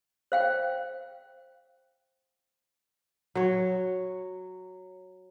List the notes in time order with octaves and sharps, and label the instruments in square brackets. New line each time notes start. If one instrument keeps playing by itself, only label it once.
[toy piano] C5 F5 G5
[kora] F#3 C#5